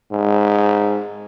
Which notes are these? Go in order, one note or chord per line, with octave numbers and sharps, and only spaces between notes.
G#2